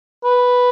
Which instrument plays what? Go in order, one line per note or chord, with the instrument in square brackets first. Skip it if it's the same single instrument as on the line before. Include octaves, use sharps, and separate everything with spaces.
[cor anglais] B4